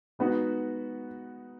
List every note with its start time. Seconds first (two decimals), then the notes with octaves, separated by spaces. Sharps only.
0.19 G#3 B3 D#4 F#4 B4